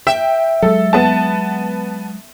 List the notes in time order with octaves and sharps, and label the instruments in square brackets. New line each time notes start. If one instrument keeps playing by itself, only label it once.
[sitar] E5 [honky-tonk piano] G5
[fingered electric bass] F#3 G#3 [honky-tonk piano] A4
[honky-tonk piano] B3 A5